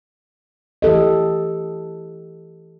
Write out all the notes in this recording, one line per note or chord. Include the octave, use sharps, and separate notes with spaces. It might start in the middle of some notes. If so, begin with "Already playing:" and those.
E3 G4 A4 D#5